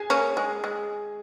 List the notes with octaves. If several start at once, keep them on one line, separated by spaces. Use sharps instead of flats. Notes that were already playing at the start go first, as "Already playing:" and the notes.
Already playing: G#4 G#5
A#3 C#4
G#3
G#3